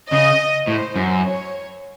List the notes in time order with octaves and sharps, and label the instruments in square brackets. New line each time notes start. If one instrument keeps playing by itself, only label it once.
[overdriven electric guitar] C#3 [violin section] D#5
[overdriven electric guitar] A2 [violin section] C5
[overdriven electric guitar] F#2
[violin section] C#5